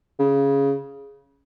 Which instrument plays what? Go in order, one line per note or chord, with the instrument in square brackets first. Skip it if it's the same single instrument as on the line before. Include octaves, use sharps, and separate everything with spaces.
[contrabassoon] C#3